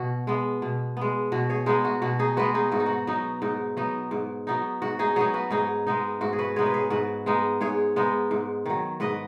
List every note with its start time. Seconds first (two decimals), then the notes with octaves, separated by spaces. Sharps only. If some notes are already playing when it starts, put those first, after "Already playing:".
Already playing: B2 F#4
0.27 G#3 B3
0.62 B2
0.97 G#3 B3
1.32 B2 F#4
1.50 G#4 C#5
1.66 G#3 B3 D#4 G#4
1.85 F#4
2.02 B2 F#4
2.19 D#4 G#4
2.37 G#3 B3 F#4 B4
2.54 D#4 G#4
2.72 G#2 F#4
2.80 D#4
2.86 F#4
3.07 F#3 B3 D#4
3.42 G#2 D#4
3.77 F#3 B3 D#4
4.11 G#2
4.47 F#3 B3 D#4
4.82 G#2 F#4
4.99 D#4 G#4
5.16 F#3 B3 D#4 G#4 C#5
5.34 F#4 B4
5.51 G#2 D#4 G#4
5.87 G#3 B3 D#4
6.21 G#2 F#4
6.33 G#4
6.39 F#4 B4
6.56 G#3 B3 D#4 G#4 C#5
6.66 B4
6.74 G#4 C#5
6.90 G#2 F#4 B4
7.26 G#3 B3 D#4
7.61 G#2 G#4 C#5
7.96 G#3 B3 D#4
8.31 G#2
8.66 D#3 F#3
9.00 G#2 B4 D#5